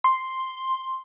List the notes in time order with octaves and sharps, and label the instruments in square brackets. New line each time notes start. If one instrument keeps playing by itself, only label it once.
[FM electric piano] C6